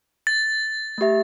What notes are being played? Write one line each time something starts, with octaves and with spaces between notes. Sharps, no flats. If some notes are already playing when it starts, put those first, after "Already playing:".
A6
A3 G4 E5